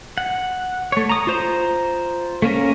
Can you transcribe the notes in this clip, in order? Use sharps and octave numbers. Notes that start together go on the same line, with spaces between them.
F#5
A3 C#5
A#5 D#6
F4 C5 A#5
A3 A#3 C#4 A#4